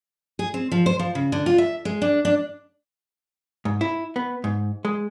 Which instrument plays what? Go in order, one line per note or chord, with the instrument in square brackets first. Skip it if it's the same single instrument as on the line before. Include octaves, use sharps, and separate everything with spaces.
[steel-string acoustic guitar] G#4
C4
F3
C5
F3
C#3
D3
F4
E5
G#3
D4
D4
[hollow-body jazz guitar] G#2
E4
B3
G#2
G#3